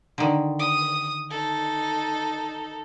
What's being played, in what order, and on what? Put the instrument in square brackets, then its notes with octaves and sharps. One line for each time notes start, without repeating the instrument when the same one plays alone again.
[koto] D3 D#3
[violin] D#6
D#4 A4